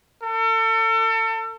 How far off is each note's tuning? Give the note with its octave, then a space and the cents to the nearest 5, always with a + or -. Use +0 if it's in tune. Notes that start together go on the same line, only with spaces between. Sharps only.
A4 +35